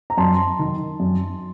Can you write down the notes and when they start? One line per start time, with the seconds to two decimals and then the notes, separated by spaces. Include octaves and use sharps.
0.10 A#5
0.17 F#2 A5 C6
0.59 D#3
1.00 F#2